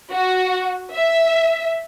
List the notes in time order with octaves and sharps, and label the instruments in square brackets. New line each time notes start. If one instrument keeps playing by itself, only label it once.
[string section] F#4
E5